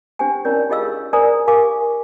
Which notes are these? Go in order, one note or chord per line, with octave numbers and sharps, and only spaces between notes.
D4 G4 C5 G5 G#5
C#4 D#4 E4 A#4 C#5 D5
F4 G4 G#4 D#5 F5 E6
A#4 C5 D5 G#5 A#5 D#6
G4 A#4 F5 G#5 D6